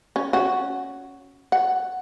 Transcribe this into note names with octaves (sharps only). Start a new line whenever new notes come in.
C#4
C#4 F#4
F#5